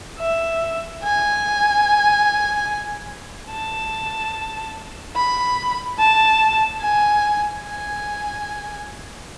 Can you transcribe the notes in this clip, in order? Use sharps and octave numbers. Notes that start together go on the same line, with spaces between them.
E5
G#5
A5
B5
A5
G#5
G#5